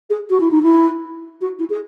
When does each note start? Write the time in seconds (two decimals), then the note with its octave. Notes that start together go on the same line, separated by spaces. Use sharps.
0.10 G#4
0.29 F#4
0.40 E4
0.51 D#4
0.62 E4
1.41 F#4
1.58 E4
1.69 G#4